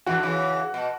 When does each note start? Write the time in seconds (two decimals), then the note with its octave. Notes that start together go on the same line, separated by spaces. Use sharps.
0.07 E3 F#4
0.15 D3
0.23 C#3 E3
0.74 B2